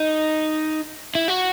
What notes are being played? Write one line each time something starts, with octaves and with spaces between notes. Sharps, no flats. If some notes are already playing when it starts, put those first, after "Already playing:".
Already playing: D#4
E4
F#4